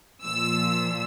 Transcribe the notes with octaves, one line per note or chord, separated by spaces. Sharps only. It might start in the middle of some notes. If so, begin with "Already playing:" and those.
A#2 F3 E6